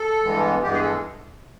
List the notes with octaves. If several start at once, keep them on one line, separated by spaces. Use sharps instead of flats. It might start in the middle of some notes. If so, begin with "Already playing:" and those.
Already playing: A4
G2 E3 G#3 B3
G2 E3 G#3 B3 G4
G#4
A4